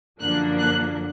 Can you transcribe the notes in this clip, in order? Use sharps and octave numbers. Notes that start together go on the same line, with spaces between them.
F#2 D3 F3 A#3 D4 F#6
F#6